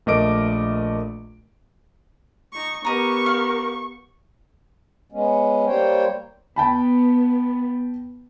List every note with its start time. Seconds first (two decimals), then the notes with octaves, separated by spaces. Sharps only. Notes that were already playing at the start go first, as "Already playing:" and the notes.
0.06 A#1 A3 A#4 D#5 D6 D7
2.53 D#4 C#6
2.85 B3 G4 A#4 D#5 A#5 C#6
3.26 F5
5.12 G#3 B3 C#4
5.66 G3 A#3 C5 C#5 G5
6.56 B3 G5 A5 B5